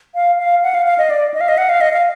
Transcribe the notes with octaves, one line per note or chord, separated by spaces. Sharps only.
F5
F5
F#5
F5
F5
D#5
D5
D#5
F5
D#5
F#5
F5
D#5
F5